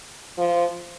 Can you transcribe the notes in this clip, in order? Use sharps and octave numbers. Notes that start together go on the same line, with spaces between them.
F3